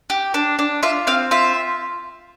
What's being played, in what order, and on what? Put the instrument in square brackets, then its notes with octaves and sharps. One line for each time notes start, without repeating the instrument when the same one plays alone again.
[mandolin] G4
D4
D4
F4 E5
C4 F5
F4 E5